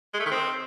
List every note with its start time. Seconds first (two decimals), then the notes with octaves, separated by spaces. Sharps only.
0.14 G#3
0.20 A3
0.25 D#3
0.31 C4